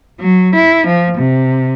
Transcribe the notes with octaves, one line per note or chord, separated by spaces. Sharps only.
F#3
E4
F3
C3